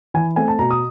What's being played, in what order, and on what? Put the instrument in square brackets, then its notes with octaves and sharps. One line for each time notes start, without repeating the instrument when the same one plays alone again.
[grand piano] E3 G#5
A3 C4 G#5
A5
B2 A#5
D#6